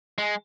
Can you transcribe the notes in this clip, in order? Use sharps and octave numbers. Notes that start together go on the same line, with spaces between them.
G#3